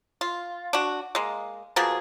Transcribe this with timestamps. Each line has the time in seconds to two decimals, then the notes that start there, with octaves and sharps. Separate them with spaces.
0.21 F4
0.73 D4 F#4
1.15 G#3 A#3
1.76 B2 F3 A#3 G#4